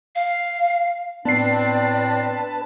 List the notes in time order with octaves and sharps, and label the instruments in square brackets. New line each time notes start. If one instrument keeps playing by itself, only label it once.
[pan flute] F5
[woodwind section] A2 C4 D4 [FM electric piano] B3 C7 [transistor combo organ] B4 A5 [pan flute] D5